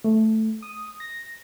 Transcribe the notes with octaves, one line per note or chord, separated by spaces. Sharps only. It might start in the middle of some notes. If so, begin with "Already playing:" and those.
A3
D#6
A#6